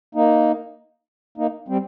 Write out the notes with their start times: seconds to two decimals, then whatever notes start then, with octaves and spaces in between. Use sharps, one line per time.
0.15 A#3 D#4
1.38 A#3 D#4
1.68 G3 C4